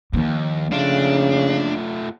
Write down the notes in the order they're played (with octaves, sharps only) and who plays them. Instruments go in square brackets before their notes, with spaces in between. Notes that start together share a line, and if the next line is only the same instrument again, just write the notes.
[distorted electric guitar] D#2 G#2 [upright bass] F3 A#3
[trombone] C#3 [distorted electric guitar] A3 F4 [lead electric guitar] D4